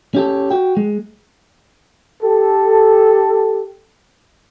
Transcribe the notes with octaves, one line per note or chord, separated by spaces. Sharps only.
C#4 G4 A4
F#4 G5
G#3
G4 A4